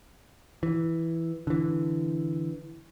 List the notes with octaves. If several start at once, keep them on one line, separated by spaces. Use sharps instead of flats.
E3
D3 E3